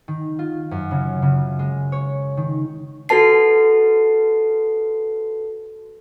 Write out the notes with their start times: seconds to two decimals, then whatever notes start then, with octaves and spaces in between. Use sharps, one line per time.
0.08 D#3
0.39 F4
0.71 F#2
0.91 C#3
1.22 C#3
1.59 G#3
1.92 C#5
2.37 D#3
3.09 F#4 A4 B4 A5 C7